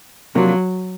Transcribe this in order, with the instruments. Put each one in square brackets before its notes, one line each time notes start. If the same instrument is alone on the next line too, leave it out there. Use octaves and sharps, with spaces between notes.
[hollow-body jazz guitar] C3 F3 A#3 D4 F4 [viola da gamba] F#3